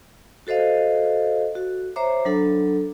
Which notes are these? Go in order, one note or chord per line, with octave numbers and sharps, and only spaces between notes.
F#4 A4 C5 D#5 F5
F#4
C5 C#5 E5 A#5 D6
F#3 D4 A4